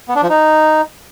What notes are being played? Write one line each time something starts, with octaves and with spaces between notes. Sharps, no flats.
B3
D4
F3
D#4